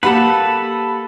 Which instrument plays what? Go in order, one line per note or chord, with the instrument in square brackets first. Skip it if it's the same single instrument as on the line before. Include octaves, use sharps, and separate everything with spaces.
[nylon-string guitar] A#3 G4 F#5 [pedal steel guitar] A4 B4 [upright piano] B5